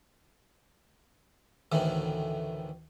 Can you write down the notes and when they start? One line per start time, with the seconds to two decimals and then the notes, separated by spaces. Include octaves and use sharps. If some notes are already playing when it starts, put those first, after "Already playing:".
1.72 D2 A2 D#3 E3